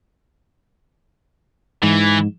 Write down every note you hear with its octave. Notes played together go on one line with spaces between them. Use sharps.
G#2 E3